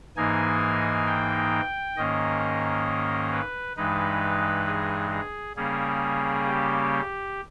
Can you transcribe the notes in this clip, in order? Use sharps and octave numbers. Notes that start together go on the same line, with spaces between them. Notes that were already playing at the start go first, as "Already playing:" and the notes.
G#2 E3 A#3 D#4 G#5
G5
G#2 D#3 A#3 C#4 D#5
B4
G2 E3 G#3 D#4 B4
G#4
G#4
C#3 G3 A#3 C#4 G#4
G4